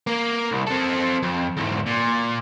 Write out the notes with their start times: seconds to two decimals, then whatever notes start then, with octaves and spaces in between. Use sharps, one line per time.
0.07 A#3
0.51 C2
0.67 C4 A4
1.22 F2
1.57 E2 G#2
1.86 A#2